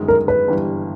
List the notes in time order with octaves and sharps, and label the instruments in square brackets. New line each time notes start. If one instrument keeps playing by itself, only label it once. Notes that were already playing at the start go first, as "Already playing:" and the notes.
Already playing: [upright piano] G1 F#2 D#3 G#3
[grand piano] A#4
B4
[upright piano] G1 G2 E3 G3